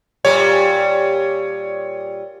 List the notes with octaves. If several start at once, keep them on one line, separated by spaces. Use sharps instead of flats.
A#2 G3 C#5